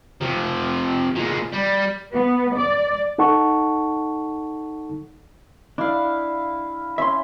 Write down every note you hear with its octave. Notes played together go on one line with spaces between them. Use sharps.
C3 F3
A#2 G#3
G3
B3
D5
D#4 A4 F#5 A5 C#6
D4 E4 F5
C#4 E5 C6